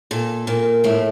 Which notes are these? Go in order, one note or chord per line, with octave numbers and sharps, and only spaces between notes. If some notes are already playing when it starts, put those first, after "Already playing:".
A#2 A4
A#2 A#3
A2 A3